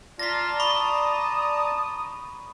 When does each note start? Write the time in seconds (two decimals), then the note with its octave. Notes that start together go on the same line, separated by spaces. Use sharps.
0.19 F4 D5 A5 A#5 A#6 B6
0.60 B5 C#6 D#6